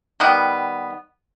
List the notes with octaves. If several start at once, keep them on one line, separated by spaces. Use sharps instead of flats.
D#3 G3 B3